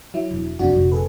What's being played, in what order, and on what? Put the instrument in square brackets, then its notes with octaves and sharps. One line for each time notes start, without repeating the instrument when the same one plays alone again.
[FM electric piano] F#3 E4
[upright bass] E1
[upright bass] F2 F3 [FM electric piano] C3 D4 F#4
[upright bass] F1 A#1
[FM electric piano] G#4 A4 B4